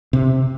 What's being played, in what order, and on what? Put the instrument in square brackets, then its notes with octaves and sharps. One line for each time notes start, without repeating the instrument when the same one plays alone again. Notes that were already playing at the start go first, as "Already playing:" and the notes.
[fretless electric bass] C3